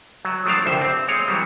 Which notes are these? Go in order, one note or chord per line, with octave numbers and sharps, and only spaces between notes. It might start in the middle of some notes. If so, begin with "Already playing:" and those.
F#3
F3 F#3 A3 D4 F5 A5
C2 G2 D3 C5 E5
C4
G#3 C4 C#5 F5
E3 F#3 G3